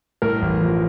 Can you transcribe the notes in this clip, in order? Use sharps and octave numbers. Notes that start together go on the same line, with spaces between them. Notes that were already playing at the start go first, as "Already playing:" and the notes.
A2 A#4
A1
F3